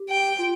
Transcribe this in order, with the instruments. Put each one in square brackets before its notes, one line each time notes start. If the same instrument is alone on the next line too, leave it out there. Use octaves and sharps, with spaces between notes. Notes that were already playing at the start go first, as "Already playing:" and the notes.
Already playing: [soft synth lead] G4
[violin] G5
[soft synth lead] F4